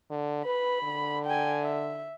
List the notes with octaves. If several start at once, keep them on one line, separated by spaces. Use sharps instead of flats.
D3
B4 B5
D3
G5 G#5
E5